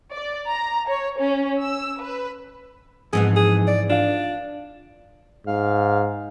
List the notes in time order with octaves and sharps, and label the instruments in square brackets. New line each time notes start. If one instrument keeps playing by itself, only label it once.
[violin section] D5
A#5
C#5
C#4
E6
B4
[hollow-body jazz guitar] F2 [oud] G#2 E3 B3 [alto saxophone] G#4
[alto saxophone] G#4
D5
[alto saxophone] D4 [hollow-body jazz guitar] F4 F5
[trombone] G#2 [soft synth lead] F5